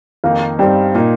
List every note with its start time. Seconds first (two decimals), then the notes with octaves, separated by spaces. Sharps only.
0.24 F2 D#3 A#3 D#4 F5
0.59 G2 G3 C4 D#4 G5
0.95 A#2 A#3 D#4